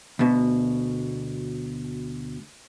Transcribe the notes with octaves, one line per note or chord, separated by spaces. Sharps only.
D2 B2